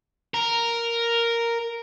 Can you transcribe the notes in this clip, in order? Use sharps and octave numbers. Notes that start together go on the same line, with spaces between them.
A#4